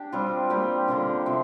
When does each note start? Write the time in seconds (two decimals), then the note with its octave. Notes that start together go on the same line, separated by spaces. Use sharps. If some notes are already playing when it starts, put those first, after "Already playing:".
Already playing: D4 G4
0.12 G3 C4 F4
0.50 G3 A#3 G4
0.88 D3 A#3 D4 F4
1.26 C3 F3